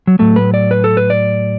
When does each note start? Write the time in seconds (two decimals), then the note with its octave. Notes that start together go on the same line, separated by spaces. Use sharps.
0.07 F#3
0.19 A2 F#3 A3
0.36 B4
0.54 D5
0.71 B4
0.84 A4
0.97 B4
1.10 D5